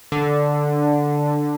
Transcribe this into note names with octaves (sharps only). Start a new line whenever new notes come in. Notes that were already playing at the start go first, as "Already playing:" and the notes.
D3